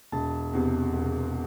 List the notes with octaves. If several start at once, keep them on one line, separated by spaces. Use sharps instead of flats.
E1 A5
E2 C3
E1